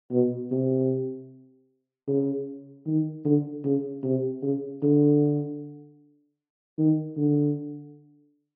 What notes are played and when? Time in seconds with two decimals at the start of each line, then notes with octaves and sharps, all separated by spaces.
0.12 B2
0.51 C3
2.08 C#3
2.87 D#3
3.25 D3
3.65 C#3
4.04 C3
4.42 C#3
4.83 D3
6.78 D#3
7.17 D3